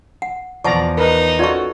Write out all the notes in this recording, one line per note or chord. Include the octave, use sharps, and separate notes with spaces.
F#5
E2 F3 D5 F#5 A5 A#5 C#6
D#4 A#4 B4
C#4 F4 F#4 A4 D5 C#6